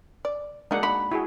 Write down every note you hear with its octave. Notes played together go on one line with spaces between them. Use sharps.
D5
F#3 G#3 A#3 D4 D#4 F#5
B5
E4 F#4 G#4